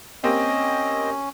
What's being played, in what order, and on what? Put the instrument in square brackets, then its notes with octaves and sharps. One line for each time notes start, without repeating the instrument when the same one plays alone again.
[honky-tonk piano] A#3 C4 G4 [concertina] C#4 [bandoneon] D#5